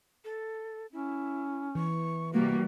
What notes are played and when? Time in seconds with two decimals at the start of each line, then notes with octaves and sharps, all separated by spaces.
0.25 A4
0.93 C#4 E4
1.75 E3 C#6
2.33 C3 G3 A#3 F#4